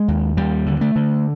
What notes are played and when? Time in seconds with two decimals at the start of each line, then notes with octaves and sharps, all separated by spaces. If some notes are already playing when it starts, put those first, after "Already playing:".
Already playing: G#3
0.08 D#2
0.37 D#2 G3
0.66 D3
0.81 A3
0.96 D3